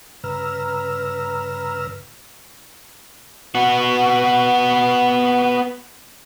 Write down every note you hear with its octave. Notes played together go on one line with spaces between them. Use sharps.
G2 C#3 B4 A#5 E6 F6
B3 F#4